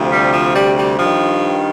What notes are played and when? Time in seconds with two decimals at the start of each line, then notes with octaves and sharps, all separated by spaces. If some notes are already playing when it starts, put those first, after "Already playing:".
Already playing: D2 C3 F3
0.11 G3
0.33 F3
0.55 G3
0.77 G3
0.99 G2 D#3 F3